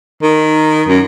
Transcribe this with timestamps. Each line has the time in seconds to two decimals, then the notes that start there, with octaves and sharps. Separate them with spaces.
0.22 D#3
0.88 F#2